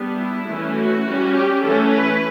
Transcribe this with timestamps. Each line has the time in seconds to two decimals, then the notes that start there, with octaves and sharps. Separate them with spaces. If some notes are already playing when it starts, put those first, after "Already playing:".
Already playing: G3 B3 D4
0.18 E4
0.47 E3 A3 C#4
0.76 F#4
1.05 G3 C#4
1.35 G4
1.63 E3 A3 C#4 A4
1.94 B4